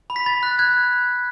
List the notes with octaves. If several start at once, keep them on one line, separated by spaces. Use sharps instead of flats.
B5
B6
B5 A6
F#6
F#6 G#6